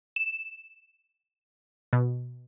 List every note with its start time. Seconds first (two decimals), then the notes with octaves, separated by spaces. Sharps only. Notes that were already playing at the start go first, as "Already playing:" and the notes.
0.16 E7
1.93 B2